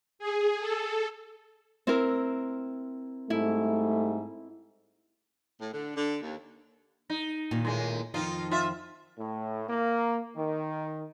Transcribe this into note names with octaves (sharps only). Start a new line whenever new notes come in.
G#4
A4
C4 E4 A#4
G#2 G3 A3 E4
A2
D3
D3
D#2
D#4
D#2 A#2 D#3
A2 G#3
F2 D#3 F3 D#4 F4
F4 E5
A2
A#3
D#3